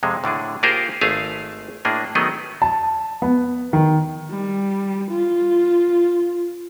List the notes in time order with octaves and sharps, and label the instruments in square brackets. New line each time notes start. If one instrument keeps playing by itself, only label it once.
[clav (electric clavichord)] F2 C3 G#3
A2 D3 D4 G#4
A#3 F4 G4 G#4 A#4 C5
G#1 A3 G#4 E5 F5
A2 A#3 D4 G#4
D#3 F#3 A3 B3 G#4 D#5
[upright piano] A5
B3
D#3
[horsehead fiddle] G3
F4